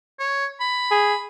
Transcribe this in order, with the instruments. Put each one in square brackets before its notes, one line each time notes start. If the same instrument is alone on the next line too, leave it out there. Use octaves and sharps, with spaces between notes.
[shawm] C#5
B5
[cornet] G#4